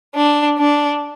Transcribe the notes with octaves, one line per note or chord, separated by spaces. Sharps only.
D4
D4